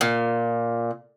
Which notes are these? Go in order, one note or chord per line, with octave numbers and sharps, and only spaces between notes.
A#2